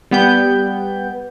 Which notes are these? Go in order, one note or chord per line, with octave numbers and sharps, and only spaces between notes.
G3 B3 G5 G6